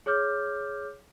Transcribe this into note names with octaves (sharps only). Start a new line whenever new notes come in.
G#4 C#5 D6 F6 G6